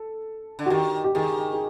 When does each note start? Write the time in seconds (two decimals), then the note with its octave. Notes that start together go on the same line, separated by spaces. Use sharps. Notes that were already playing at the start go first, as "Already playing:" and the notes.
Already playing: A4
0.59 D3
0.66 F#4
0.70 D#3 G4
1.04 G4
1.15 D#3 G#4
1.53 G#4